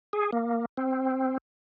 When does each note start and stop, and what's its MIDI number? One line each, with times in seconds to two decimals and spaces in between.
0.13 0.31 68
0.33 0.65 58
0.77 1.38 60